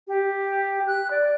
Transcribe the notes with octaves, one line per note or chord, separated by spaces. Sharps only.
G4
F#6
D5